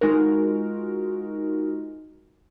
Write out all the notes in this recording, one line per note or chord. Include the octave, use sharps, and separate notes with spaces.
G#3 D#4 F4 F#4 A#4